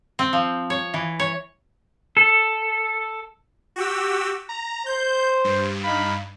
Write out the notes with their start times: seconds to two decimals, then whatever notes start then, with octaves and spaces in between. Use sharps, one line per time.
0.19 C4
0.33 F3
0.70 C#5
0.94 E3
1.20 C#5
2.17 A4
3.76 F#4 G4 E6
4.49 A#5
4.86 C5 G6
5.44 G2
5.84 D#4 F5 B5